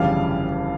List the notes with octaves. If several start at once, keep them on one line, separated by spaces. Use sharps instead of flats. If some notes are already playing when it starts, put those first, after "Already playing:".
Already playing: G1 F2 C#3 E3 G3 F5